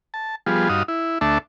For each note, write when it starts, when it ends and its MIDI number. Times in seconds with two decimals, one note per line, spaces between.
0.14 0.35 81
0.47 0.69 53
0.47 0.69 55
0.47 0.69 59
0.47 0.69 65
0.47 0.69 68
0.69 0.83 43
0.69 0.83 63
0.69 0.83 66
0.69 0.83 77
0.69 0.83 87
0.88 1.18 64
1.21 1.38 38
1.21 1.38 57
1.21 1.38 62
1.21 1.38 76
1.21 1.38 81